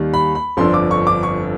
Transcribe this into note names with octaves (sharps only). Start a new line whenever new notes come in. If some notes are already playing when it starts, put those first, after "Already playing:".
Already playing: D#2 D#3 G3
B5
B5
G1 F2 D3 C6
D6
C#6
D6
C#6